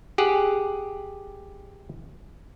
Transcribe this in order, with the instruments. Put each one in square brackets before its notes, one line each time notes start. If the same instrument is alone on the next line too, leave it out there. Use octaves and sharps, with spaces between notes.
[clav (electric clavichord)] G4 G#4 F#5